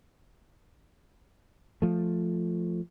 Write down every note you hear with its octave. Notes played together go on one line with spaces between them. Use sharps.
F3 A3